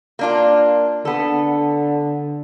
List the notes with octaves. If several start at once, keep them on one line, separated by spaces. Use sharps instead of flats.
A#3 D4 F4
D3 B3 A4